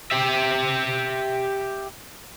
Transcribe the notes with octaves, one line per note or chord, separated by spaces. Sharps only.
G4 E5